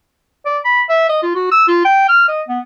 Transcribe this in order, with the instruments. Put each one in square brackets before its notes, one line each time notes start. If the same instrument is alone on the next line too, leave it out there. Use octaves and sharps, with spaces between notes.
[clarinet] D5
B5
E5
D#5
F4
F#4
E6
F4
G5
F6
D#5
B3